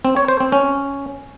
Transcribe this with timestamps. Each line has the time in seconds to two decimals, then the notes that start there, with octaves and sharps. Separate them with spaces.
0.05 C4
0.17 C#5
0.28 C5
0.40 C4
0.52 C#4